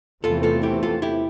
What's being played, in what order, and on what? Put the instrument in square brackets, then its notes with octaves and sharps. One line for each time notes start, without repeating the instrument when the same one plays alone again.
[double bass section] E2 C3 E3 A3 C4 [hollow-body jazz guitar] F4 A4
[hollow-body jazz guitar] F4 A4
E4 G4
F4 A4
E4 G4